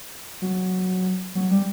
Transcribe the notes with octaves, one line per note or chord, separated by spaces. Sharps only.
F#3
F#3
G3